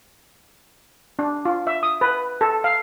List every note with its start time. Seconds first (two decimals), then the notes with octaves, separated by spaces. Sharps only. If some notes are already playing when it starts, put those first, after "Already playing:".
1.19 D4
1.45 F4
1.67 E5
1.83 D#6
2.01 B4
2.41 A4
2.64 F5